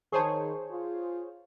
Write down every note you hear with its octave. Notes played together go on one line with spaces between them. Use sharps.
D#3 G#4 C5 C#5 A5 C#6
F4